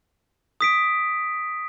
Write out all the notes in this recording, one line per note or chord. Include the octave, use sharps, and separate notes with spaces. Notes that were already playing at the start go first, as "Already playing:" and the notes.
D#6 B6 D7